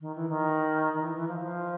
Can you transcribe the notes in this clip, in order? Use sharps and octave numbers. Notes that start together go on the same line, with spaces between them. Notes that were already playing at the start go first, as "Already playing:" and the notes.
D#3
E3
D#3
D#3
E3
E3
F3
F3